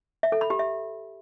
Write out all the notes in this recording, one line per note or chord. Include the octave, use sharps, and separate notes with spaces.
E5
A4
B5
G4
E5